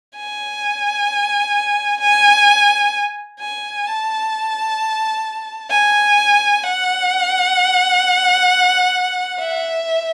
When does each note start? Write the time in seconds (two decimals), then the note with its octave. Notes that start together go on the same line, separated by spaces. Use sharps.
0.16 G#5
2.01 G#5
3.39 G#5
3.86 A5
5.70 G#5
6.64 F#5
9.40 E5